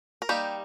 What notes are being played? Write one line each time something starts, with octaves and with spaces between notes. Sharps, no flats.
A#4
G3 A#3 D#4 G4